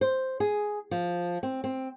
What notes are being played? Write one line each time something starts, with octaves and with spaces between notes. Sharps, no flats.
C5
G#4
F3
C4
C4